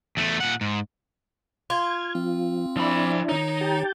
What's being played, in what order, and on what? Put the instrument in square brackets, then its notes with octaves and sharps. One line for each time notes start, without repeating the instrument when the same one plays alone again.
[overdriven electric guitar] E2 A3
A#2 F#5
G#2
[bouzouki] F4 [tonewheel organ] G#6
[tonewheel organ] F3 [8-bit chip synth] C4
[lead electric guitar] F3 B5 [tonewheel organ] D4 E4
[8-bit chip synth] D#3 C#5 [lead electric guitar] D#4
[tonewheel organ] G4 G5 A5